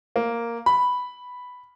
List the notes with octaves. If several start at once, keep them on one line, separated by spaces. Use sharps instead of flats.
A#3
B5